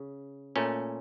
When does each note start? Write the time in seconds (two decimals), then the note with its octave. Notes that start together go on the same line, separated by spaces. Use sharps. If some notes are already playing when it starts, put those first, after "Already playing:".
Already playing: C#3
0.56 A#2 A3 C#4